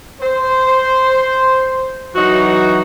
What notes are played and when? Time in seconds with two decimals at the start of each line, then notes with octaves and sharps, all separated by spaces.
0.21 C5
2.15 E3 F#3 D#4 F#4